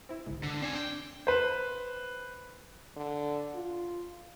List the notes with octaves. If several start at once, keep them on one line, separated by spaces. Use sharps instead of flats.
C4 E4
G1 C2 G#2
D3
C4 D4 G#5
G5
B4 C5
D3
F4